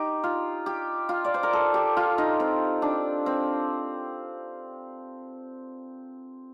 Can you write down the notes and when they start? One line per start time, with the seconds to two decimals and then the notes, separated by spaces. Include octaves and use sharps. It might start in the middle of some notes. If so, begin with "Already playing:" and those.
Already playing: D#4 G4
0.24 F4
0.66 G4
1.09 F4
1.25 D5
1.34 C5
1.43 A#4
1.53 A4
1.74 G4
1.97 F4
2.18 D#4
2.40 C4
2.82 D4
3.26 C4